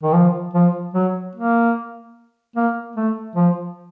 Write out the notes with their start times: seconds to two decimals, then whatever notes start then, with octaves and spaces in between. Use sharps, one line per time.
0.03 D#3
0.14 F3
0.54 F3
0.94 F#3
1.35 A#3
2.56 A#3
2.96 A3
3.36 F3